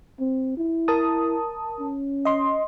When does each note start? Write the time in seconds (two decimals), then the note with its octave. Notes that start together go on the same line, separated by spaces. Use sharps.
0.20 C4
0.58 E4
0.88 A#4 A5 D#6
1.80 C#4
2.25 D#5 C6